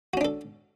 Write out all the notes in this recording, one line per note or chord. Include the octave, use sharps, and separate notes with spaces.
C#4 D4 F#4 A4